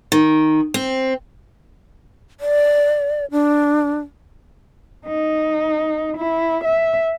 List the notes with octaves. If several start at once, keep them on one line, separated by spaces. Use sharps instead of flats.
D#3
C4
D5
D4
D#4
E4
E5